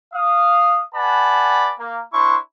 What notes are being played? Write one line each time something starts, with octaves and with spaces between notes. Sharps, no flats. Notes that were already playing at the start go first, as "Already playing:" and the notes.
F5 D#6
B4 D5 F#5 G#5 A5 B5
A#3
D4 E4 A#4 C5 C6 C#6